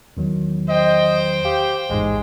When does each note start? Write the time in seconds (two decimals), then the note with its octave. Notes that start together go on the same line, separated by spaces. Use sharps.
0.17 E2 D#3 F#3
0.69 C5 D#5 G5
1.45 G4 F5
1.90 A1 E2 G#2 G#3